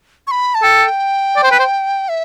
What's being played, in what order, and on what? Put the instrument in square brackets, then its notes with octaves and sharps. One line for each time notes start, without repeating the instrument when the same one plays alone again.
[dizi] C#6
B5
A5
[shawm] A4 [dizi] G5
[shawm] D5
C5
B4
C5
[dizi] E5